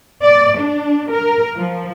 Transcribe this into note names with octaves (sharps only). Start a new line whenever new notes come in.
D5
D4
A#4
F3